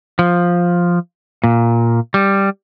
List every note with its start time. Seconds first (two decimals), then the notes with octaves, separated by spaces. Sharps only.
0.19 F3
1.44 A#2
2.14 G3